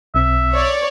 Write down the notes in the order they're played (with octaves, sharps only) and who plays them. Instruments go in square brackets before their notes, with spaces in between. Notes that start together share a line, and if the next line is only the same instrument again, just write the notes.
[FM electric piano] B1 C4 [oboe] E5
[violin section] C#5 D5